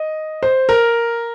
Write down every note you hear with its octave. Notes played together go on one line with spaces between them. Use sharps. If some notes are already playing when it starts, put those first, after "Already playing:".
Already playing: D#5
C5
A#4